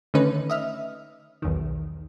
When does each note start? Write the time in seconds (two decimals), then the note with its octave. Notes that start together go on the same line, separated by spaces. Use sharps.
0.14 D3 D#3 A3 C#4 D#4 B4
0.50 D#5 E5 F6
1.42 B1 E2 D#3